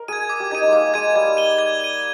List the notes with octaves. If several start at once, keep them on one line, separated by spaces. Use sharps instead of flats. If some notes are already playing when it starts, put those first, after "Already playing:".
Already playing: A#4
G#4 G#6 D#7
D6
G4
D#4 G#6 D#7
D#4
G#3 A#3 D6
G#3 G#6 D#7
G3 G#6
D#7 G7
G#6
D#7 G7